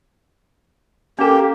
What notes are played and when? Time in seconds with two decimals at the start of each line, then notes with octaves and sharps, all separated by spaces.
1.19 A#3 C#4 G4 A4